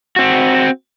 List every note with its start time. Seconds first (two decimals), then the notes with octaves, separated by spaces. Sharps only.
0.16 C4 F#4